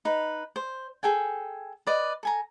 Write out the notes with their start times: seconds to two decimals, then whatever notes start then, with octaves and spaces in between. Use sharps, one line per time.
0.05 D#4 B4
0.56 C5
1.03 G#4 A4 G5 G#5
1.87 B4 D5 D#5
2.23 A4 G#5 A#5